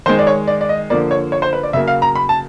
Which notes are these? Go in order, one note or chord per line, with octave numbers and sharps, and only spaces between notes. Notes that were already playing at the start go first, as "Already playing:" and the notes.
D#3 G#3 C5
D5
C#5
D5
D5
D#5
D3 F3 A#3 D5
C#5
C#5
C5
B4
D5
C#3 F#3 A#3 E5
F5
A#5
B5
A5